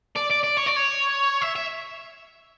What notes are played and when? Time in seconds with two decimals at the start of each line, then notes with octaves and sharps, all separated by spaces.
0.17 D5
0.31 D5
0.44 D5
0.58 C#5
0.67 D5
0.76 C#5
1.42 E5
1.56 E5